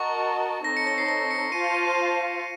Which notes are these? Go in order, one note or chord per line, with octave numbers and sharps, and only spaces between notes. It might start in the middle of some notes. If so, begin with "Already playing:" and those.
Already playing: F#4 A#4 D#5 A5 C#6
C4 D#4 A4 C#5 A#6
C#7
A#6
C7
A#6
C#7
F4 C5 F5 A5 D#7
C#7
D#7